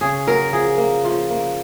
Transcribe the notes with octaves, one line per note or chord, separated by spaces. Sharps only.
C#3 G#4
F#3 A#4
F3 G#4
A#3
F3 F4
A#3